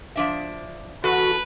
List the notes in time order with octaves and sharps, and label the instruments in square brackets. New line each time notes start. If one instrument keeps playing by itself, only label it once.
[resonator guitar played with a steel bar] F3 D4 E5
[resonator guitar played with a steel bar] E2 A4 [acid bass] F#4 [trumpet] B4